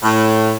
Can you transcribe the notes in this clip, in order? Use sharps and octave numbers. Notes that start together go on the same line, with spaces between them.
A2